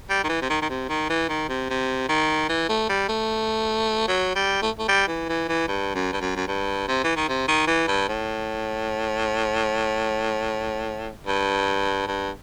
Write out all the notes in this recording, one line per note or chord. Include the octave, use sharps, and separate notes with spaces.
G3
D#3
E3
C3
D#3
D#3
C3
D#3
E3
D#3
C3
C3
D#3
E3
A3
G3
A3
F#3
G3
A3
A3
G3
E3
E3
E3
G2
F#2
G2
F#2
F#2
G2
C3
E3
D#3
C3
D#3
E3
G2
A2
G2
G2